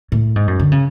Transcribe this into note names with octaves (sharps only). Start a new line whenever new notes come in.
A2
G#2
F#2
D3
C#3